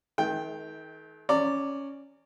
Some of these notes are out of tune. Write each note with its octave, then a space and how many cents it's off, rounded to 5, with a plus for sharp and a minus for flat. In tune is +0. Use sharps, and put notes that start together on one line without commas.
D#3 +40 A3 -40 G5 +0
C#4 +0 D5 +0 A#5 -35